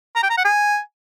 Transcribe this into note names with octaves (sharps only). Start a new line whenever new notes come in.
A#5
G5
A#5
F#5
G#5